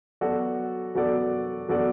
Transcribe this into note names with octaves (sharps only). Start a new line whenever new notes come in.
F#3 B3 F#4 A4 D5
F#3 B3 F#4 A4 D5
F#3 B3 F#4 A4 D5